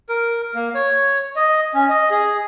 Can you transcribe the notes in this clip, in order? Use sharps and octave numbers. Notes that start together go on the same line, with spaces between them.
A#4
A#3
C#5
D#5
C#4
D#5
G#4